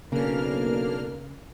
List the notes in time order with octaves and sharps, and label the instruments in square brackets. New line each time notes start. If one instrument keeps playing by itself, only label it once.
[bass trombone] B1 [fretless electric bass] C#3 [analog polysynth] A#3 D4 F6 [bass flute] A#4